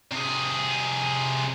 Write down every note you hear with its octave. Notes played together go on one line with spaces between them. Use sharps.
C3 G#4